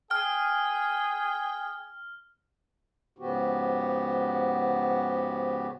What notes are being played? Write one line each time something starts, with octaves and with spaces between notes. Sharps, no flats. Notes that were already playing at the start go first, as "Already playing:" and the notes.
G#4 G5 F6
G#2 C#3 F3 B3 F#4 G4